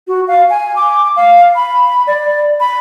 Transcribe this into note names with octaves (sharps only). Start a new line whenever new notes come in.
F#4
F5
G#5
D6
F5
B5
D5
B5